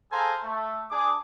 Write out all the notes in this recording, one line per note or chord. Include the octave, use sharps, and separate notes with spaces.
G#4 A4 C5 F5 G#5 A#5
A3
D4 G#4 D6